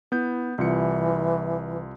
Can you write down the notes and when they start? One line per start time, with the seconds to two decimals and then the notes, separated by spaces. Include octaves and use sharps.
0.12 B3 E4 G6
0.58 C2 E3 F4 C#7